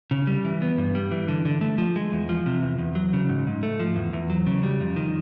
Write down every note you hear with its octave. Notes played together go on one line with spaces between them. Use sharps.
C#3
G3
E3
B3
G2
G3
E3
D3
D3
A3
F3
G#3
E2
F3
C3
E2
E2
F#3
C#3
G#2
G#2
A3
F3
E2
E2
F#3
C#3
G3
F2
D#3